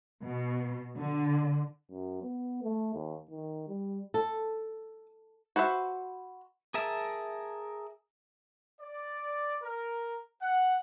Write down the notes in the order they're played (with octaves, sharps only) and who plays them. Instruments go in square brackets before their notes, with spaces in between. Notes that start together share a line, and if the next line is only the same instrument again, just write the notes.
[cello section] B2
D3
[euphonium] F#2
B3
A3
D#2
D#3
G3
[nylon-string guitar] A4
[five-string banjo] F#4 B4 C5 E5
[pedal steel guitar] G#4 A#4 E5 A5
[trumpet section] D5
A#4
F#5